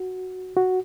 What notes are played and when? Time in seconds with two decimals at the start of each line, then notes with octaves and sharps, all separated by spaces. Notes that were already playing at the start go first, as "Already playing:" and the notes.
Already playing: F#4
0.57 F#4